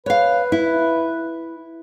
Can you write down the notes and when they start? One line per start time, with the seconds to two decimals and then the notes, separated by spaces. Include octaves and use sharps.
0.06 B4 C#5 F5
0.52 E4